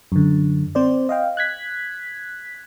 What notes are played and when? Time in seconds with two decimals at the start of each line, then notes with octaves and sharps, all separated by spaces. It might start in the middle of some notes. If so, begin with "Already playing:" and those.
0.12 F#2 D3
0.75 C4 C5 D5
1.09 D#5 F5 G5
1.37 F#6 G#6 B6